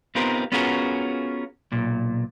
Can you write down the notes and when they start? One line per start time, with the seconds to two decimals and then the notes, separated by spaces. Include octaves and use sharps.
0.15 B3 C4 D#4 F4 G4 A#4
0.52 B3 C#4 F4 F#4 G#4 A#4
1.72 B1 A#2